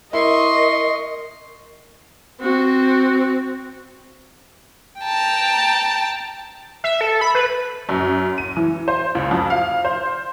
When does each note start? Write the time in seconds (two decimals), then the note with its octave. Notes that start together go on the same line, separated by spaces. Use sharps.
0.13 E4 A#4 D#5 C6 C#6
2.41 C4 F#4
5.01 G5 A5 A#5
6.84 E5
7.01 A4
7.21 B5
7.35 B4
7.89 F#2
8.38 D#7
8.57 E3
8.88 C5
9.15 C#2
9.31 F2
9.50 F5
9.85 C5